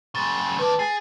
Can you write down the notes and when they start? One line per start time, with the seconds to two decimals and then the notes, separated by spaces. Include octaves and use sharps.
0.15 F#2 C#3 C6 A6
0.59 D#3 B4 D5 A5
0.79 G#4 A6 C7